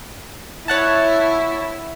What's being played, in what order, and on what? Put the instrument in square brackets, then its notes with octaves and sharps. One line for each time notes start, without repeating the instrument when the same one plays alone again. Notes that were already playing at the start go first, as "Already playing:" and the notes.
[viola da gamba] E4 [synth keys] C#5 F#5 A5